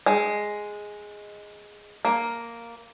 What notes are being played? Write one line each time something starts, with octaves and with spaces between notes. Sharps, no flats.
G#3
A#3